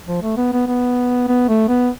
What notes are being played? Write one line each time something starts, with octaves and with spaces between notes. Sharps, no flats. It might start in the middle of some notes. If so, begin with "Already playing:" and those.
F3
A3
B3
B3
B3
B3
A3
B3